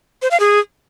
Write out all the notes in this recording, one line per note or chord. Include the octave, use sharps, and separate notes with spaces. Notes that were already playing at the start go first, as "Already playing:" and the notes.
C5
F5
G#4